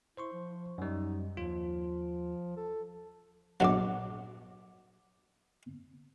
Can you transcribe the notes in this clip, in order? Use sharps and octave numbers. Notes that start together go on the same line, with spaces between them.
E4 C5 C6 C#6
F3
F#2 G3 D#4
D#2 F3 F4
A4
A#1 B2 F#3 F#5 D6